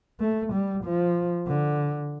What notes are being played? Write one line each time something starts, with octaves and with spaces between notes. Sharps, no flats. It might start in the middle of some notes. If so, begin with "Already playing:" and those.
A3
G3
F3
D3